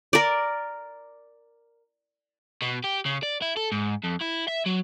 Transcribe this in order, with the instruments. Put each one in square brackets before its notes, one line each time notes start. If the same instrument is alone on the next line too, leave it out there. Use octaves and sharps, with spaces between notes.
[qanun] A#4 D5
[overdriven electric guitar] B2
G4
C#3
D5
E4
A4
G#2
F2
E4
E5
F#3